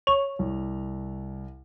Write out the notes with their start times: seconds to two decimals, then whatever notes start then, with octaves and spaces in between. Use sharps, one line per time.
0.07 C#5 F7
0.39 C2